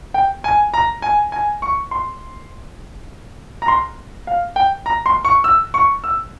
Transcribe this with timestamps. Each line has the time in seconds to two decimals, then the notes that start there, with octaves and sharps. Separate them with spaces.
0.14 G5
0.44 G#5
0.74 A#5
1.02 G#5
1.32 G#5
1.62 C#6
1.91 C6
3.62 A#5
3.68 C6
4.27 F5
4.56 G5
4.86 A#5
5.06 C6
5.25 C#6
5.44 E6
5.74 C#6
6.04 E6